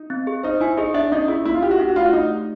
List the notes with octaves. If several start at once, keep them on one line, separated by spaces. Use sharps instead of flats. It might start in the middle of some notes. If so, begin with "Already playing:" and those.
Already playing: D#4
C4
G#4
D#4 C5
E4 G#5
D#4 G#4
D4 E5
C#4 D#4
E4 G#4
A#3 E4
F4
E4 G4
F#4
D4 G4
F#4
A3 F4
F#4
A3 D#4
G4